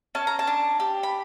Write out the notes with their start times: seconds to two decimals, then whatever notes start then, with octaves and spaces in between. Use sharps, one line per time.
0.15 C#4 A5
0.27 A#5
0.39 A5
0.47 D4
0.80 G4
1.03 B5